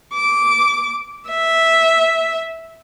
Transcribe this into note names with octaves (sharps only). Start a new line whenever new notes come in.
D6
E5